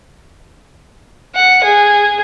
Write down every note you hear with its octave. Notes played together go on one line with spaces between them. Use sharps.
F#5
G#4